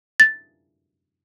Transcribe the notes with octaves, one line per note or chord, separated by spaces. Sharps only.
A6